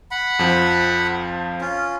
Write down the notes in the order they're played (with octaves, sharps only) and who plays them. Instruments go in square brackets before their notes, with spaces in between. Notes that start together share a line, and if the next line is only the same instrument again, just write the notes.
[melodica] F#5 B5
[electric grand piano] F2 F3
[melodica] C#4 F4